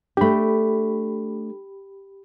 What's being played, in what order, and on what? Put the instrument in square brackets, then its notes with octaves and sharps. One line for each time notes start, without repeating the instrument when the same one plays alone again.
[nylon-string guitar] A3 D4 [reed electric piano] G4 B5